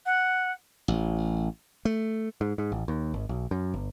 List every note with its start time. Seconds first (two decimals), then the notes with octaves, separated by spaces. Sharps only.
0.05 F#5
0.88 A1
1.85 A3
2.41 G#2
2.58 G#2
2.72 A1
2.88 D#2
3.14 G#1
3.29 B1
3.51 F#2
3.74 G1